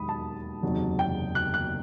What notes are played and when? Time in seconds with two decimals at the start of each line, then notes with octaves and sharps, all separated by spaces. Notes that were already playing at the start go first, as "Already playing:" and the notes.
Already playing: E1 D#2 D#3 F#3 B5 D#6
0.09 A5
0.62 F#1 E2 C3 D#3 F#3
0.99 G5
1.35 F#6
1.54 F#6